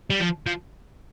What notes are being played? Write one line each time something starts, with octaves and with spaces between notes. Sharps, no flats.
G3
F3
F3